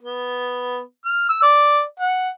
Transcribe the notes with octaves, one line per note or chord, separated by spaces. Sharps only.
B3
F6
E6
D5
F#5